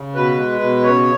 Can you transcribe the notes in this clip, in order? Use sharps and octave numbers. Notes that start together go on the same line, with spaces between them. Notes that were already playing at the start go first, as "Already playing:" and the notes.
Already playing: C#3
B2 B4
G#3
B2
C#3 C#5